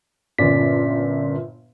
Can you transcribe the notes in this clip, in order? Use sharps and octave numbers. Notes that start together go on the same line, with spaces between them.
G1 A#2 C#4 D5 B6